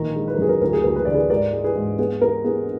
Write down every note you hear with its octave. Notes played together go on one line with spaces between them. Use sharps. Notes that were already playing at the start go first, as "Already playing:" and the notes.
Already playing: A#1 D#3 A#4
G#3
B4
A#4
F#2 G#4
A#4
D2 A#4
G#4
D2 A#4
B4
D3 D5
G#4 B4
G#2 A#4 D5
G#3
G#4 B4
G#2
B3 G#4
B3 A#4
B3 G#4